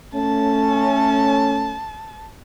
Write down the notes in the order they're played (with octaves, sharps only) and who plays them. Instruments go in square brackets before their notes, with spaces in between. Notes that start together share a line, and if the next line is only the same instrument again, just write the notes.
[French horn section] A3 C#4 [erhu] A5